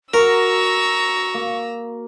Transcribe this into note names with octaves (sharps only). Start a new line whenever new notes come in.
F#4 A#4 A#5 C#6 E6
A#3